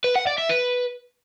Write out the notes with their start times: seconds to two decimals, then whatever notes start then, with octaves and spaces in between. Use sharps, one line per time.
0.04 B4
0.16 F#5
0.27 D5
0.38 E5
0.49 B4